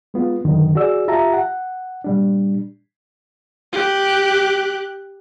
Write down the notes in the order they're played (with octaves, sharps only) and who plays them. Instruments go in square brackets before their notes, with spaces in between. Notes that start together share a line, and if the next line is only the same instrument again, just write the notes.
[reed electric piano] G#3 B3 F4
F#2 A#2 D3 D#3
F#4 G#4 D5 E6
F4 G4 E5 A5 A#5
F#5
A#2 G3 D4
[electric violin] G4 F#6